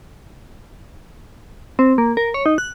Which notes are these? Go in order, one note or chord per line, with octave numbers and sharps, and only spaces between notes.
C4
A#3
A#4
C#5
D#4
F#6